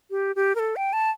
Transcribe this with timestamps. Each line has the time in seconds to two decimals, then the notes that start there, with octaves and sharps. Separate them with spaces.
0.11 G4
0.36 G4
0.55 A#4
0.59 A4
0.76 G5
0.93 A5